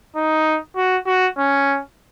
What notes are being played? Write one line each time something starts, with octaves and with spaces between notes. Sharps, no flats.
D#4
F#4
F#4
C#4